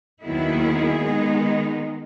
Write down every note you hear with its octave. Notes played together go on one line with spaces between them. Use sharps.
D#2 D#3 F#3 B3 E4 G#4
D#3 G#3 B3 D#4